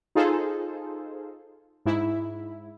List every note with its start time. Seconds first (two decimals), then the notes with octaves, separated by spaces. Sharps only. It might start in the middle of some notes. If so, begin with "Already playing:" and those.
0.15 D#4 F4 G#4 A4 C5
1.86 G#2 E4